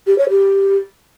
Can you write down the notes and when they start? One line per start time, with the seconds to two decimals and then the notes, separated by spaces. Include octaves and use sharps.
0.07 G4
0.18 C#5
0.30 G4